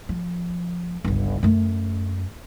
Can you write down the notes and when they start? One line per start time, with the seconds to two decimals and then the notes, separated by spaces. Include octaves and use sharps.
0.09 F3
1.05 G1 C#2
1.43 F#2 A3